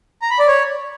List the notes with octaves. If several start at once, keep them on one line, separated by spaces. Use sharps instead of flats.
A#5
B5
D5
C#5